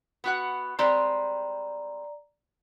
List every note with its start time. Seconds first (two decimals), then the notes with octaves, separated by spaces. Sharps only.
0.24 B3 F#4 F#5
0.79 G3 G#3 C4 D5 A#5